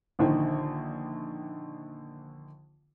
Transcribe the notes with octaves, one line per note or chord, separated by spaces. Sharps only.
A#1 D3 D#3